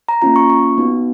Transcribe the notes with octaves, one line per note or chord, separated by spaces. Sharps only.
A#5
A#3 C#4 F4 A#5
C#6
C#6
B3 D#4 F#4